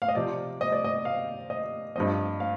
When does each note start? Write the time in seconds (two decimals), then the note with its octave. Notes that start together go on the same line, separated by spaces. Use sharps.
0.02 F5
0.08 D#5
0.15 C3 F3 C4 D5
0.61 D#5
0.72 D5
0.84 D#5
1.05 F5
1.50 D#5
1.96 G2 F3 C4 D#5
2.40 F5